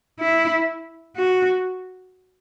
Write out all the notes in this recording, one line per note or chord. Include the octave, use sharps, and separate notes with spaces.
E4
F#4